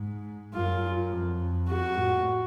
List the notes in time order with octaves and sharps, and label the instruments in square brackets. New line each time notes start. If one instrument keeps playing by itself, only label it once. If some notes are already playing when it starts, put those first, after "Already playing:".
Already playing: [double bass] G#2
[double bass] F#2 [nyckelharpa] F4
[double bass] F2
[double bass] F2 [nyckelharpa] F#4
[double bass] A2